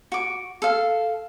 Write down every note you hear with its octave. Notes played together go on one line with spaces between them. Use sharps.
F#4 D6
A4 F5